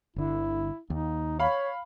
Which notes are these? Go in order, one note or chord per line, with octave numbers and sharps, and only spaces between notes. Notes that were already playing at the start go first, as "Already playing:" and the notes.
G1 D3 E4
D#2 D#4
C#5 F5 B5